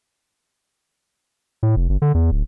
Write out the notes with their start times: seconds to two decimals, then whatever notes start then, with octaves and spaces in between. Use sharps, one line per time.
1.63 A2
1.76 F1
1.89 G1
2.02 D3
2.14 E2
2.32 D1